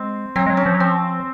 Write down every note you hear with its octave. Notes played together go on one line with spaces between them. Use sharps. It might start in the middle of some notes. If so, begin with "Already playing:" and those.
Already playing: G#3 C4
F#3 C4
G#3
F#3
C#4
F3
F#3
F3 C4